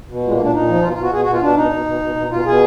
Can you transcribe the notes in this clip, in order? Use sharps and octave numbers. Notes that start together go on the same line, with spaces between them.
B2
A#2 G#3
A#3
A#2 D4
A#2 D#4
F3
B2 F4
F4
B2
F#4
B2 G#4
F#4
B2
F4
B2 D4
B2 D#4
B2
B2
B2
B2
B2 F4
B2 G#4